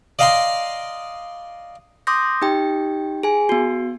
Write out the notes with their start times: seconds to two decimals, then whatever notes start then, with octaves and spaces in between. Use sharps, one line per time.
0.19 D5 D#5 F5 G5 A#5 C6
2.07 C6 D6 D#6 G6 A#6
2.42 D#4 G4 G5
3.23 G#4 G#5
3.49 B3 F#4